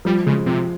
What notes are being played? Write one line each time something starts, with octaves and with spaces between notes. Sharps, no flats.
F3 G3
C#3 G#3
C3 F3